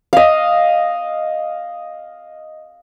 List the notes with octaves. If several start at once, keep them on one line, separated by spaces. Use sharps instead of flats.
D#5 F5